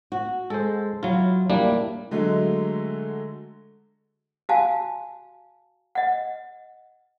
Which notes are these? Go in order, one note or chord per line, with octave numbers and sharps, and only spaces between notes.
F#4
G#3 A4 C5
F#3 E4 F4
G3 A#3 D4 E4
D3 F#3 G#3 A3
F#4 F5 G#5 A5
D#5 F#5